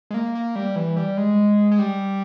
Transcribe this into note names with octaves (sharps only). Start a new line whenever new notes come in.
G#3
A#3
A#3
G3
E3
G3
G#3
G#3
G3